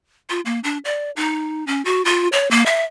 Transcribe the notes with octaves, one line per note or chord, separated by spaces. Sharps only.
F4
A#3
D4
D5
D#4
C#4
F#4
F4
C#5
A#3
E5